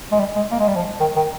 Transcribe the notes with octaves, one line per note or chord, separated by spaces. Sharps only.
G#3
G3
G#3
A#3
G#3
G3
F3
D#3
D#3